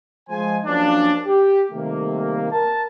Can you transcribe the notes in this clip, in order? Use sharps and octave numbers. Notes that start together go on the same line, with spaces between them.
F3 G#3 C5 G#5
F3 F#3 A#3 C#4 D4
G4
C3 D#3 G3 A3 A#3
A#4 A5